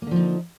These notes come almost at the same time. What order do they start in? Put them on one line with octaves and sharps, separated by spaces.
A#3 D3 F3 D#4